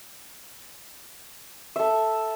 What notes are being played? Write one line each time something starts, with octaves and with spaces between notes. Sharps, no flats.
A4 E5